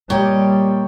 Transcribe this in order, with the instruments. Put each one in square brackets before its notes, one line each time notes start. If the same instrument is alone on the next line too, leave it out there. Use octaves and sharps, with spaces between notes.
[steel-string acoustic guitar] A#2 D#5 [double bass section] G3 [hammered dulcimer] C#5 G5